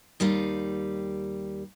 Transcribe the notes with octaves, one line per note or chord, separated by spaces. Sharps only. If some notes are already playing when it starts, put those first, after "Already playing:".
D#2 G3 D#4 F5